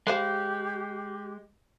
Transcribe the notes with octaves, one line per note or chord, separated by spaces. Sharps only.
G#3 G4 B4 C5 F5